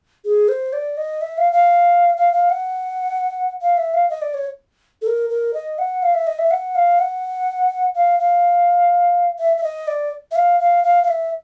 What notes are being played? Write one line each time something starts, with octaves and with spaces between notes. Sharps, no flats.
G#4
C5
D5
D#5
E5
F5
F5
F5
F5
F#5
F5
E5
F5
D#5
D5
C#5
A4
A#4
A#4
D#5
F#5
F5
E5
D#5
E5
F#5
F5
F#5
F5
F5
E5
E5
D#5
D5
E5
F5
F5
F5
F5
E5